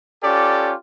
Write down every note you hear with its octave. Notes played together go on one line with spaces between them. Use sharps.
C#4 F4 G4 A4 D5